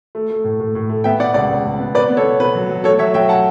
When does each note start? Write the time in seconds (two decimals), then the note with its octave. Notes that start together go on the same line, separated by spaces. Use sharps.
0.15 A3
0.30 A3
0.44 A2
0.60 A2
0.75 A2
0.89 A3
1.04 B3 E5 G5
1.20 B2 D5 F#5
1.34 C#2 D5 F#5
1.50 C#2
1.65 C#2
1.80 B3
1.95 B3 B4 D5
2.10 B3
2.17 A4 C#5
2.25 B2
2.40 B3 B4
2.55 F#3
2.69 F#3
2.84 A3 A4 C#5
2.99 F#3 C#5 E5
3.14 F#3 E5 G5
3.29 F#5 A5